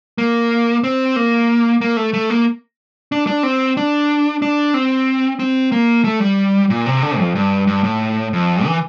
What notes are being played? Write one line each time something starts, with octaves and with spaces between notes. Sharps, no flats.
A#3
C4
A#3
A#3
A3
A3
A#3
D4
D4
C4
D4
D4
C4
C4
A#3
A3
G3
A#2
C3
D3
F2
G2
G2
A2
F2
E3